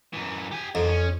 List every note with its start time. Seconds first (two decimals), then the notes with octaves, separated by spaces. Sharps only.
0.13 F#2 E3
0.51 G4 G#5
0.75 F2 G#2 D#3
0.88 C#4